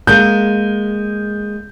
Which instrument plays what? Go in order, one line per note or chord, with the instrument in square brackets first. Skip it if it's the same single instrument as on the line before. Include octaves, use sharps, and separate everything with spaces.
[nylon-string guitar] G#3 A#3 [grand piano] G6